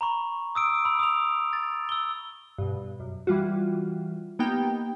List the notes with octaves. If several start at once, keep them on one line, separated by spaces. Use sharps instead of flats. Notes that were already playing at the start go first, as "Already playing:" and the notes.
A#5 B5 C#6
D#6 E6 D7
B5 E6
D#6 F7
A6
E6 G7
G2 B2
F#2
E3 G3 F4 F#4
A#3 B3 D#4 G4 G5